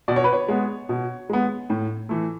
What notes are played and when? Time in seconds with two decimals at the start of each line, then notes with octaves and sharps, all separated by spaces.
0.08 B2 D5
0.16 C#5
0.24 B4
0.33 C#5
0.48 G#3 B3
0.89 B2
1.30 G#3 B3
1.70 A2
2.09 E3 A3